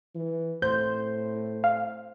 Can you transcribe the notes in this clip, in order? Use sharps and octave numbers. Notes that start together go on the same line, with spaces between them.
E3
A2 C5 G6
F5